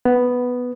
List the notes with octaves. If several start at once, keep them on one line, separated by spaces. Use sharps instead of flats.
B3